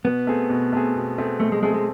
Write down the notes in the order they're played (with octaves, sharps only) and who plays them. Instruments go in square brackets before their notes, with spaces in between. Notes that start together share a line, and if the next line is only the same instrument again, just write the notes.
[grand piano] B2 [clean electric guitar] B3
[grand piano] A3 C4 G#4
B2
A3 C4 G#4
B2
A3 C4 G#4
[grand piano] B2 [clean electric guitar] A3
[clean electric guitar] G#3
[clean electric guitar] G#3 [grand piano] A3 C4 G#4
[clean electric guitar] G#3